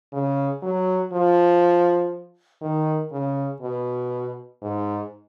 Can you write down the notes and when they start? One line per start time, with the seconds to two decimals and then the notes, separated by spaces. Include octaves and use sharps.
0.13 C#3
0.62 F#3
1.13 F3
2.62 D#3
3.12 C#3
3.61 B2
4.62 G#2